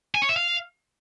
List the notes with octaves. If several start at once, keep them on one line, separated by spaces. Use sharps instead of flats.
G#5
C#5
E5
F5